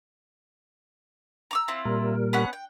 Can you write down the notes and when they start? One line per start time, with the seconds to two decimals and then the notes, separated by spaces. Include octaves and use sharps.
1.51 A#5 D6 E6
1.68 C4 E4 F4
1.85 A#2 G3 A#4
2.33 B3 C#4 F#5
2.53 G5